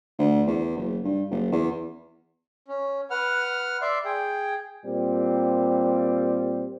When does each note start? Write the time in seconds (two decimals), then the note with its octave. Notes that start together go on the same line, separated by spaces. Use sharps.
0.19 D2
0.47 E2
0.77 F#1
1.05 G2
1.31 F#1
1.52 E2
2.68 C#4
3.11 B4 F#5 F6
3.82 D5 E5 C6
4.05 G#4 G5
4.84 A#2 G3 C4